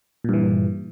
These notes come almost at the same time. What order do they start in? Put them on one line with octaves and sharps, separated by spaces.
A#2 G2 E3